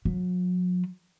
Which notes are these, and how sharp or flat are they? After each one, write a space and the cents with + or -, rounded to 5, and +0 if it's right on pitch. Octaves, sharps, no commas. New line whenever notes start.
F#3 -40